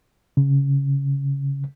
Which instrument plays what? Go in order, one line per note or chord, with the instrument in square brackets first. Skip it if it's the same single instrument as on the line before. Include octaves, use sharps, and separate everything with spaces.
[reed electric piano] C#3